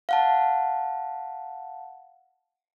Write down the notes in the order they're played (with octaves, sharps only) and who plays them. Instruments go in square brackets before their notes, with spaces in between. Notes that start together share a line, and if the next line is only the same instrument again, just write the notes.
[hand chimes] F5 F#5 A5